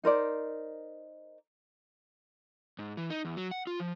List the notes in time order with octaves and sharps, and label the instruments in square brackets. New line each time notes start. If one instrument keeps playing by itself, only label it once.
[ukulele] D#4 A#4 C5 D5
[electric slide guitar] G#2
E3
D#4
E2
F#3
F#5
F4
F3